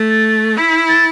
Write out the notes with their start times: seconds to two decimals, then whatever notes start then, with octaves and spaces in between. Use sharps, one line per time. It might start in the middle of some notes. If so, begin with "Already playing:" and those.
Already playing: A3
0.09 A6
0.57 E4 B6
0.88 A6